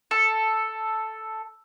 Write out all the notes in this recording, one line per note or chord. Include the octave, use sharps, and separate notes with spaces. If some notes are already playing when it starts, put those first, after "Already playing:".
A4